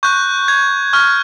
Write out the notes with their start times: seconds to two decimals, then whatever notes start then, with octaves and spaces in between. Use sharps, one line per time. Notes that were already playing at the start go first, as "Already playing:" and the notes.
0.03 C#6 F#6 G6
0.48 G#6
0.93 C#6 F6